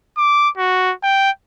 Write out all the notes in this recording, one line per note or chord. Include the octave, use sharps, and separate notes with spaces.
D6
F#4
G5